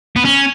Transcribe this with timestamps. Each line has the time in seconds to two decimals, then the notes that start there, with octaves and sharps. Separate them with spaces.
0.16 B3
0.25 C#4